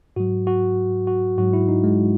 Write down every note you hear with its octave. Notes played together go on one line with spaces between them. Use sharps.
G#2 F#3 F#4
F#4
F#4
G#2 F#3 F#4
E4
D#4
G#3